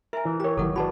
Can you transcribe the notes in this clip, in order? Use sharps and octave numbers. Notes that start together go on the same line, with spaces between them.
A#4 E5 G#5
E3
G4 A#4 C#5 A#5
G1 D#3 F#3 A4 F#5
F#4 G#4 B4 D5 A5 B5